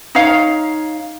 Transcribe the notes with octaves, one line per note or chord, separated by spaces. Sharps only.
D#4 C#5 F5